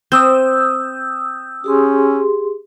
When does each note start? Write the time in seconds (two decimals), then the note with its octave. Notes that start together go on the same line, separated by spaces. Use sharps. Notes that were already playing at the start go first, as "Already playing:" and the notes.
0.12 C4 D#6 E6 G6
1.64 C#4 G4 G#4 C6